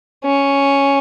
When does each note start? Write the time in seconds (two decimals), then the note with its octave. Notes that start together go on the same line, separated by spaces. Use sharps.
0.24 C#4